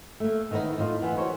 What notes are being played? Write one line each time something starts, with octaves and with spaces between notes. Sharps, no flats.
A3 A#3
D#3 E3 B3 D4 D#4
A2 D#4 F4
E3 B3
F#4 A#4 C5 C#5